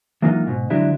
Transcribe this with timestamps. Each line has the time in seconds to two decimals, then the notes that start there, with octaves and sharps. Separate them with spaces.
0.22 E3 F#3 G#3 A#3 D#4 F4
0.47 G#2 B2
0.70 F2 D3 F#3 G#3 D4 E4